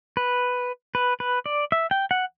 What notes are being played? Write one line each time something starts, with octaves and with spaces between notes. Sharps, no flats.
B4
B4
B4
D5
E5
G5
F#5